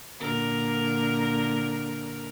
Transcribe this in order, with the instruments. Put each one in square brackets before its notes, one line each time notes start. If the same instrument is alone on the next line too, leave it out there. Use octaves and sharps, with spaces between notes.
[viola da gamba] A#2 D3 A#4